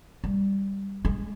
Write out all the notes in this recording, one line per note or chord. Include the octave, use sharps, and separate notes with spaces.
G3
G#3